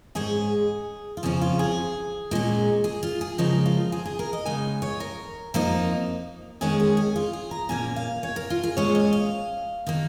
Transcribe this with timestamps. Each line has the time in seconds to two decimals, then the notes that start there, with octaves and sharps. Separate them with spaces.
0.15 G#2 G#3 C#4 G#4
1.17 F4
1.23 F2 C#3 F3 C#4 G#4
1.41 F4
1.59 G#4
2.31 A#2 G#3 C#4
2.84 G#4
3.03 F4
3.21 G#4
3.38 C#3 F3 G#3 D#4 A#4
3.66 F4
3.92 G#4
4.06 G#4
4.19 A#4
4.33 D#5
4.46 C#3 G#3 D#4 G#5
4.82 C#5
5.00 A#4
5.54 F2 F3 A#3 D#4
6.61 F2 D#3 G#3 C#4 G#4
6.80 G#4
6.97 G#4
7.16 F4
7.33 G#4
7.51 A#5
7.69 A#2 A#3 C#4 G#5
7.96 F5
8.23 C#5
8.36 A#4
8.50 F4
8.63 G#4
8.77 A#2 G#3 C#4 C#5
8.95 D#5
9.13 F5
9.87 D#3 A#3